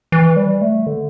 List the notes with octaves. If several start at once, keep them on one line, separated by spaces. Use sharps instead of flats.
E3
G3
A3
D3